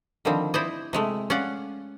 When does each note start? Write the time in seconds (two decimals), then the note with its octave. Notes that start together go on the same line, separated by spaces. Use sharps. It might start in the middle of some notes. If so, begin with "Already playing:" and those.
0.25 D3 D#3 F3 G3 C4
0.54 E4 C5 D5 D#5
0.93 C3 G#3 A3
1.30 C#4 D5 F5 F#5